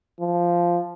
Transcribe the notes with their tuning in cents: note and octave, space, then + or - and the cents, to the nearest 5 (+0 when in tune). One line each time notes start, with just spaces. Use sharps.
F3 -5